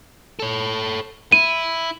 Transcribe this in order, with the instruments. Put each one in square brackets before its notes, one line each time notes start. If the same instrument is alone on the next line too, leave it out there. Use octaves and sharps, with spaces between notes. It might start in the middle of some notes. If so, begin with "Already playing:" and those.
[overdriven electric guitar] A4 C#5
[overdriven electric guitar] E4 [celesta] D#7